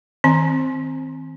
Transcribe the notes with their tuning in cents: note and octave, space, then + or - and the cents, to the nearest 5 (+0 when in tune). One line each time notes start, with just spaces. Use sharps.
D#3 +30 C4 +0 G#5 +35